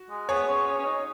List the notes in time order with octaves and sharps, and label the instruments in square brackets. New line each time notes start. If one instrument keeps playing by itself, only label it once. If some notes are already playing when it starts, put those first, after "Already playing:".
Already playing: [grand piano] F#4
[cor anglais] G#3
[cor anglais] B3 [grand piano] G#4 C#5
[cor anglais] C#4
C#4
C#4
D#4